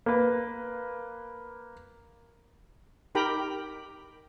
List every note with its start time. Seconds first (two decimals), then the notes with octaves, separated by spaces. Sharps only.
0.06 A#3 B4
3.15 D#4 G4 A#4 G5 A#5 B5